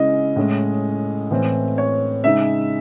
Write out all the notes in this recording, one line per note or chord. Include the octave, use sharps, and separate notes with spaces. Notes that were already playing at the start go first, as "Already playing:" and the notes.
Already playing: C#3 G#3 C#4 E4 D#5
A2 G#3 C#4
A2 E3 C4
C#5
C#3 G#3 D#4 E5